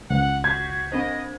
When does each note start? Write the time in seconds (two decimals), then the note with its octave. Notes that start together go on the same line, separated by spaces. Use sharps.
0.10 C#2 F#5
0.44 F#4 G6 G#6 B6 C7
0.92 C4 D4 C5 D#5